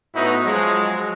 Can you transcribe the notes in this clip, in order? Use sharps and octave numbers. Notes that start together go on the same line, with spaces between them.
A2 B3 D#4 E4 F#4
F3 F#3 G#3